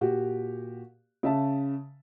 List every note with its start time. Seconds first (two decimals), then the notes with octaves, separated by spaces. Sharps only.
0.01 A#2 F#4 G4
1.23 C#3 E5 A5